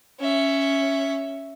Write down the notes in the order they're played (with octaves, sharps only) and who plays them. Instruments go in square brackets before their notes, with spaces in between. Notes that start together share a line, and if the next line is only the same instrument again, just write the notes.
[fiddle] C#4 E5